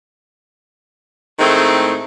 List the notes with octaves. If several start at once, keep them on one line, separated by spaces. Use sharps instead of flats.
A2 D#3 G#3 A3 C4 D#4